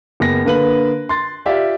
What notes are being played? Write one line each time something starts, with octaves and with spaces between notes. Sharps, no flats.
F#1 B3 A#6
D3 A#3 B4 F#7
C6 A6
F4 G4 D5 E5